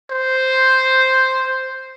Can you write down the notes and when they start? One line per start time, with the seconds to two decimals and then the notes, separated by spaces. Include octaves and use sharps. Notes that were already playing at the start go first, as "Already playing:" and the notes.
0.10 C5